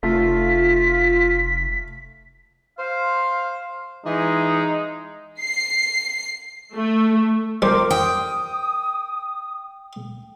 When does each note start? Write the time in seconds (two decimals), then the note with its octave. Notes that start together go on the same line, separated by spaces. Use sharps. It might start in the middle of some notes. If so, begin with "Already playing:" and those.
0.03 F1 A3 F4 B6
2.79 C5 F5
4.06 E3 G#3 D#4
5.41 C7
6.74 A3
7.62 G3 A#4 C5 D6
7.91 G5 D#6